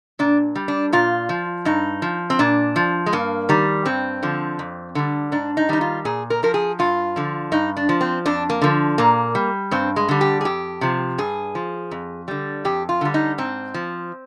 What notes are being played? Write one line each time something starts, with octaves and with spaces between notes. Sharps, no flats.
A#2 D4
G3
D4
A#2 F4
F3
G2 D#4
F3
C4
A#2 D4
F3
G#3
G2 A#3
D#3 G3
G2 C4
D3 F3
F2
D3 G3
G#2 D4
D#4
D#3 G3 D#4
F4
A#2 G#4
A#4
F3 A#4
G#4
G2 F4
D3 F3
G2 D#4
D4
F3
C4
F2 D4
A#3
D3 F3
A#2 A#3
G3
G2 C4
G#3
D3 G3
G4
G#4
F2 G4
C3 F3
G2 G#4
F3
F2
D3 G3
F2 G4
F4
D3 G3
D#4
G#2 C4
F3